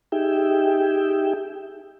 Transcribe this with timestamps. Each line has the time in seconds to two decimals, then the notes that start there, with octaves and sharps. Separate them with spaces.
0.12 D#4 G4 G#4 E5 G5